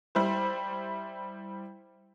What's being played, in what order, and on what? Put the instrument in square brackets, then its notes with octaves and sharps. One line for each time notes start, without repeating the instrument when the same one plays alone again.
[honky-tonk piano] G3 E4 C5